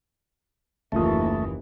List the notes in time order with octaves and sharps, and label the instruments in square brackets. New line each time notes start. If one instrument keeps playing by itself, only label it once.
[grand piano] F#1 F4 D#6 [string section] D#2 E3 [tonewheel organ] A3